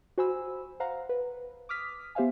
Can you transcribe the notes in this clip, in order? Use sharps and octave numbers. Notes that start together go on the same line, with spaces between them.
F#4 C5 G#5 B5 E6
C5 F5 F#5 A#5
B4
D6 D#6 F6 B6
B3 G4 C5 E5 F5 G#5